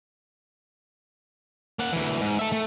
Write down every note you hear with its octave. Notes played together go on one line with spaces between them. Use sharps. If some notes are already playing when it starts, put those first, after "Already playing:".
A#3 F#5
D2 E3
G#2
A4 E5
A3